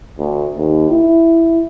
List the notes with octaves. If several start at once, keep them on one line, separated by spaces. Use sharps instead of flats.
D2
D#2
E4